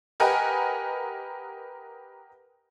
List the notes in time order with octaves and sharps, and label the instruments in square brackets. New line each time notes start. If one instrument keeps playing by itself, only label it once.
[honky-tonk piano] G4 A#4 B4 D#5 F#5 G#5